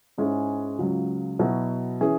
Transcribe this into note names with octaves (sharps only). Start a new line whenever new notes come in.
G#2 G#3 C#4 E4 G#4
C#2 C#3 F#3
B2 F#3 E4
E3 C#4 G#4